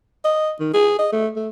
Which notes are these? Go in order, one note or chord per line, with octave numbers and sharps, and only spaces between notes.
D#5
D#3
G#4
D#5
A3
A3